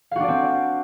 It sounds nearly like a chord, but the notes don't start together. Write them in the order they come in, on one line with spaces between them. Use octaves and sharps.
F5 F#4 D4 D5 C4